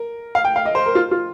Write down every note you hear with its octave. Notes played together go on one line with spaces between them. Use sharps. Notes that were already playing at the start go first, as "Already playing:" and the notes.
Already playing: A#4
F5
G5
F5
D#5
C5
A#4
F4
F4